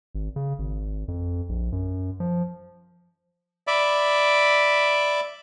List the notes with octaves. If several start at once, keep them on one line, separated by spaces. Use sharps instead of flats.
G#1
C#3
G#1
F2
A#1
F#2
F3
D5 E5 B5 D6